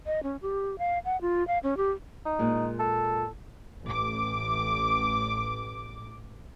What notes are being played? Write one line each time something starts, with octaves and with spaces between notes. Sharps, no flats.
D#5
C#4
G4
F5
F#5
F4
F5
C#4
G4
D#4
A#2 G#3
A4
A1 D6